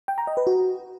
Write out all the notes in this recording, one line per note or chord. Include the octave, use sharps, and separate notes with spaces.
G5
A#5
D#5
B4
F#4